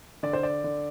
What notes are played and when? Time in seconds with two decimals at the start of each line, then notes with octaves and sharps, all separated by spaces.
0.23 D3 D5
0.33 C5
0.43 D5
0.64 D3